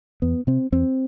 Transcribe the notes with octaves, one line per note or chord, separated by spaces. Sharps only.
E2 B3
C3 C4
E2 C4